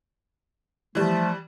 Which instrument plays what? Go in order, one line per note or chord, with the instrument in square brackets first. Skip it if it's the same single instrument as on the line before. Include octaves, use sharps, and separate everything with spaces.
[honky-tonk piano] E3 G3 [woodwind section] F3 A3